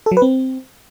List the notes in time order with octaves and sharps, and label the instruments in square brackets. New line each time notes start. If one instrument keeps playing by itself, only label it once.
[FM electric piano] A4
F#3
B4
C4